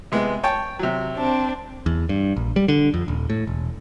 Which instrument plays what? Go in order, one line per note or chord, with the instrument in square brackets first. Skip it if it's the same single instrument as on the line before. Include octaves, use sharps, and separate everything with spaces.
[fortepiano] C3 G#3 B3
C#5 G5 A5
C3 F#3
[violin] C4 D4
[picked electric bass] E2
G2
A#1
G3
D3
F2
D#1
A2
E1